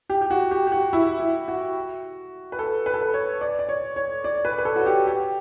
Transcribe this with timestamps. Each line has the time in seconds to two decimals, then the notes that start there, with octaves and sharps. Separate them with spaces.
0.10 G4
0.21 G4
0.31 F#4
0.51 G4
0.67 G4
0.72 F#4
0.93 E4
1.20 E4
1.48 F#4
2.52 B4
2.59 A4
2.86 B4
2.94 A4
3.02 B4
3.14 C#5
3.41 D5
3.59 D5
3.69 C#5
3.96 C#5
4.24 D5
4.45 B4
4.58 B4
4.65 A4
4.76 F#4
4.86 G4
5.07 G4